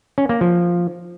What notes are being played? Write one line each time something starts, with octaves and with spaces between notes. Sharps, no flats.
C#4
A#3
F3